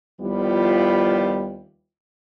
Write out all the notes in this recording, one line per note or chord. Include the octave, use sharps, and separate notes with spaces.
D#2 F3 G3 B3 E4 F4